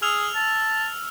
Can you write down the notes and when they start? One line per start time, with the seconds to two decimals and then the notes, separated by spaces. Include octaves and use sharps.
0.02 G#4 E6 F6 F7
0.35 A5